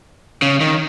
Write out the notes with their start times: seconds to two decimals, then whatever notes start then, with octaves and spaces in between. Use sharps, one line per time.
0.42 C#3
0.61 D#3